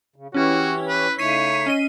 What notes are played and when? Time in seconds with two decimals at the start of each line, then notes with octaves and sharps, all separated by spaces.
0.16 C#3
0.34 E3 C#4 E4 F#4 G4 C#5
0.88 B4
1.18 C#3 A3 D#4 C#5 B6 C7 D#7
1.66 C#4 D#5 D#7